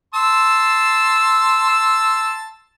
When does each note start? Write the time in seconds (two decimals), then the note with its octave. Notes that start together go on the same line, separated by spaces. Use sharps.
0.14 A5 C6 E6